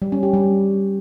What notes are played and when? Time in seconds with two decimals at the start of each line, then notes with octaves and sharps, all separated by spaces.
0.02 G3
0.12 C#4
0.23 G4
0.34 G3